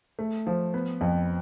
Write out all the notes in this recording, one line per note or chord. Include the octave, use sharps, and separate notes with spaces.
A3
F3
B3
F2